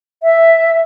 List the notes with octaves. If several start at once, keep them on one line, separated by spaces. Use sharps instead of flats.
E5